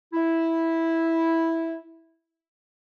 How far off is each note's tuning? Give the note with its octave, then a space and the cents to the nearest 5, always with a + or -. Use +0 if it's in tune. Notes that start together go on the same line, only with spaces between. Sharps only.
E4 -5